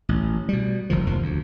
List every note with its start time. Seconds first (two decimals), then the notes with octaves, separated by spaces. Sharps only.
0.09 A1
0.49 B2 G3
0.90 F1 D#3 F3
1.07 F1 D#2 F3
1.22 D2